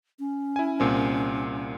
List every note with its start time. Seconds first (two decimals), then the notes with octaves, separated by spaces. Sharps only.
0.19 C#4
0.56 E4 G#5
0.80 C2 A#2 C4